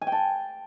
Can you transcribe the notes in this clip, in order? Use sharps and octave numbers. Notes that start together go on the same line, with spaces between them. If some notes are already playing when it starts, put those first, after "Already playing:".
G#5
G5
A5